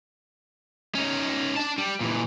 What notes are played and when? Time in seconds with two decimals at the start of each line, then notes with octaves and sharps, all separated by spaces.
0.95 C#4 D#4
1.57 D4 A5
1.78 G3
2.01 A#2 E3